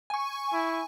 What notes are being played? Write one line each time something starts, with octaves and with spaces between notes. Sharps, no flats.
G#5 C#6
E4